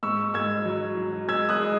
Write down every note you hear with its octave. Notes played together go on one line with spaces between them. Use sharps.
G#2 C#6 E6
G#2 E6 G#6
F#3
F#3
G#3 E6 G#6
D#6 F#6
G#3